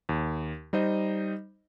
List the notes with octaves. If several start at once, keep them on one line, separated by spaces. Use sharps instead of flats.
D#2
G3 D#4 C5 D#5